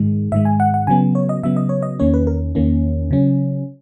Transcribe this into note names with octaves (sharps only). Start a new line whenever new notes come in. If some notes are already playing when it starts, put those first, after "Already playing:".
Already playing: G#2 D#3 G#3
G#2 D#3 G#3 E5
G#5
F#5
F#5
C#3 F#3 B3 G#5
C#5
D#5
C#3 F#3 B3 E5
D#5
C#5
D#5
E2 D#3 A#3 C#4 C#5
B4
A#4
E2 D#3 A#3 C#4
C#3 F#3 C#4